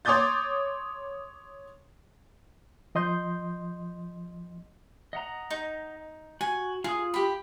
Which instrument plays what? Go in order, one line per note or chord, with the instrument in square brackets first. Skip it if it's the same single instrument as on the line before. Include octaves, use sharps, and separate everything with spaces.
[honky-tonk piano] C#5 C6 D6 D#6 G6 A6
[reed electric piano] F3 D#5 C6 G6
[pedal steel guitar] D#5 F#5 A#5
[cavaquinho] D#4
[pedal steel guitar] F#4 [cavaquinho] G#5
[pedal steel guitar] F4 D#6 [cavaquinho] G#4
[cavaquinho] G4 B5